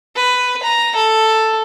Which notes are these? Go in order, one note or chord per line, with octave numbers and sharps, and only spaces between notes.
B4
A#5
A4